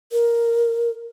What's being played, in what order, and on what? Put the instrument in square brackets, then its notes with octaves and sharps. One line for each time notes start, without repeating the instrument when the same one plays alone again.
[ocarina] A#4